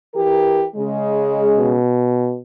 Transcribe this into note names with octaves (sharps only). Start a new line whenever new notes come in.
E3 G4 A#4
C#3 G#3
B2